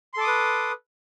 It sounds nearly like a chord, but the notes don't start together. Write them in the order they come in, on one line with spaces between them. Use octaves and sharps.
C6 A4 D6 D#6 B4